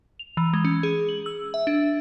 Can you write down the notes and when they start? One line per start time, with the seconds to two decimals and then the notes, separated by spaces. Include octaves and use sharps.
0.19 F7
0.37 E3
0.53 G#3
0.65 C#4
0.83 G#4
1.09 F#7
1.26 E6
1.54 E5
1.67 D4